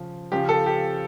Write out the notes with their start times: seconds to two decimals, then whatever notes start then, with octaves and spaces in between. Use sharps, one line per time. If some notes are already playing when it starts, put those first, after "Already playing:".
Already playing: C#3 F3
0.32 C#3 F3 G4
0.49 A4
0.66 G4